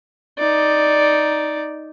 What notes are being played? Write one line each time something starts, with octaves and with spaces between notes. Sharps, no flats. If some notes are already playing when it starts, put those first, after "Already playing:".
D#4 D5